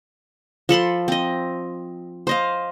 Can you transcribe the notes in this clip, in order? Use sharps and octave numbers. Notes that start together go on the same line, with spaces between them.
F3 A4 B5 C6
C4 D#5
C5 D#5 F5